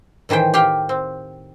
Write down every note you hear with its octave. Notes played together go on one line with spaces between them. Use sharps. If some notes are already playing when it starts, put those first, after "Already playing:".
A2 D#3 E3 C5 G5
G4 F5 G5
C4